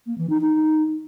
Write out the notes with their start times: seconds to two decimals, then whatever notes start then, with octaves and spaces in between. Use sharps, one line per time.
0.06 A#3
0.18 E3
0.30 D#4
0.41 D#4